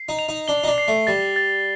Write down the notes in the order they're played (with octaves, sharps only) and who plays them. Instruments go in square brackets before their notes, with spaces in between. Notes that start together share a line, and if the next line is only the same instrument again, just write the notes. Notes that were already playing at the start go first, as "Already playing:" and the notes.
Already playing: [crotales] C7
[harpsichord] D#4
[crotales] F7
[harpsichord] D#4
[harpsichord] D4 [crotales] G7
[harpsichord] D#4
D4
[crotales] C7
[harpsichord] A3
[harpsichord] G3 [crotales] A6
[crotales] A6